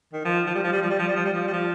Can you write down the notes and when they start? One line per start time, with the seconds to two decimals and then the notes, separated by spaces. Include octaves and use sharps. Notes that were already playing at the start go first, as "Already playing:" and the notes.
0.13 D#3
0.25 F3
0.47 F3
0.55 G3
0.64 F3
0.73 G3
0.82 F3
0.90 G3
0.99 F3
1.08 G3
1.16 F3
1.25 G3
1.33 F3
1.48 G3
1.53 F3